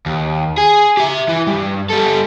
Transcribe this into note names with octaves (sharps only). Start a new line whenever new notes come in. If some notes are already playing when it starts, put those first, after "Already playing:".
D#2
G#4
G4 E5
E3
G2
G3 A4